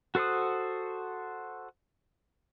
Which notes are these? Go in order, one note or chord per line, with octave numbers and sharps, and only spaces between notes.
F#4 A4 C5 F#5 D#6